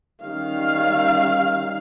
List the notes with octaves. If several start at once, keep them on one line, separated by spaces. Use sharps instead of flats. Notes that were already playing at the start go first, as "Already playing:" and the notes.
D#3 G3 C#4 F5